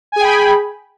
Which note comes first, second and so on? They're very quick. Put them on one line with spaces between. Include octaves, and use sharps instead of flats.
G#5 G#4 G5 B5